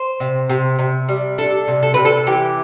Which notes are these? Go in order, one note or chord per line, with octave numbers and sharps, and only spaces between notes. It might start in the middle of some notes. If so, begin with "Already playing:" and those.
Already playing: C5
C3
C3
C3
G3
D4 A4
C3
A4
C3 B4
A4
E3 G4